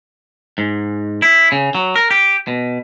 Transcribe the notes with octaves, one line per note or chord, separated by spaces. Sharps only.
G#2
E4
C#3
F#3
A#4
G4
B2